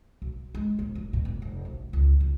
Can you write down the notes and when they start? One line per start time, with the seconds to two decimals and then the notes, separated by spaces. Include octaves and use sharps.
0.22 B1
0.55 G#3
0.79 A#1
0.95 D1
1.13 B2
1.25 F1
1.42 F1
1.65 B1
1.93 C#2
2.20 C#2